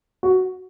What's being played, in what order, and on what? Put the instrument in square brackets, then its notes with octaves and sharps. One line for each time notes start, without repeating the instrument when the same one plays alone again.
[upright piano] F#4